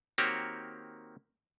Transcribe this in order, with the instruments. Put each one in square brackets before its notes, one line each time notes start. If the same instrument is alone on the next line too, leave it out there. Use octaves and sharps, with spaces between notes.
[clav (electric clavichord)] D#3 A#3 C4 F#4 G4 C#5